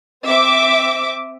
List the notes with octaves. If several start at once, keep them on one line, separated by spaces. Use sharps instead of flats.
C4 E5 D6